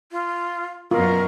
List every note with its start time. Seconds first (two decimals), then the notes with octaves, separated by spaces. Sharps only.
0.12 F4
0.91 F#2 B2 F4 A#4